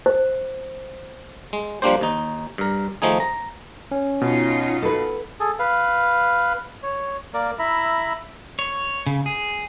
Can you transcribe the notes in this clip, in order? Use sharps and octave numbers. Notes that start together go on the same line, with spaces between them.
C5
G#3
F3 G3 A#3 D4 G4 C5
D#2 D#4
G2 A#4
D#3 F3 A3 D#4 G#4
A#5
C#4
B2 D#4 F4
A4 B4
G#4 A4
B4 F5
C#5
A#3 A#4 D5
E4 E5 A#5 B5
C#5
C#3
G#4